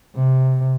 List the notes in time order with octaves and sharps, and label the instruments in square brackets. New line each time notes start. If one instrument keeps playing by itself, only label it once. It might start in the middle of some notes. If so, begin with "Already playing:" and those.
[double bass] C3